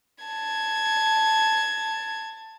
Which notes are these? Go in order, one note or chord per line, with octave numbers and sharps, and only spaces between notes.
A5 G#6